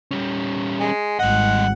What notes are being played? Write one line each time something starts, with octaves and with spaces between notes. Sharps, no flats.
G3 C#4
G#3
G#1 G3 D#5 F#5